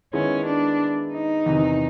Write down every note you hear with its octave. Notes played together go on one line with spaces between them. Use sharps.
D#3 G#3 B3 C#4 E4
D4
D#4
E2 C3 D#3